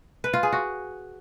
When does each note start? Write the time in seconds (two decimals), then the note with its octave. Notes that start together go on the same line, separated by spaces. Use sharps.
0.24 B4
0.33 F4
0.43 G#4
0.52 F#4